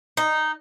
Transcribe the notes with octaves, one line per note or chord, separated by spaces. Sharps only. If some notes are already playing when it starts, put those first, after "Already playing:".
D#4